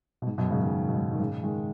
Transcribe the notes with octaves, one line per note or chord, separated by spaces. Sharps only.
B2
G#2
F#2 B2
G#2 C#3
B2 D#3
B2
G#2
D#3
G#2 C#3
D#3 G#3